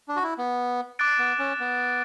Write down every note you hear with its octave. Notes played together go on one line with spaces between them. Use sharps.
D4
F#4
E4
B3
D6 F#6 A6 D7
B3
C#4
B3